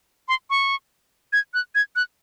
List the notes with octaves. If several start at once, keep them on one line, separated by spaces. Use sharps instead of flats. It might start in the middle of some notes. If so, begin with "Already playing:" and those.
C6
C#6
G#6
F#6
G#6
F#6